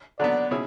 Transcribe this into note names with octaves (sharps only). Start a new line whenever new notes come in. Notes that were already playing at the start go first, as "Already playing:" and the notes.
D3 F#3 B3 D5
B2 C#4 E4 G#4